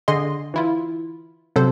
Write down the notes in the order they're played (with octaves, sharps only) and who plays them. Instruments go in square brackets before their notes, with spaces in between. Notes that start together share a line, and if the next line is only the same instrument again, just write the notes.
[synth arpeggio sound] D3 G#4 D#5 C6
E3 E4 F4
C3 F#3 A4 C5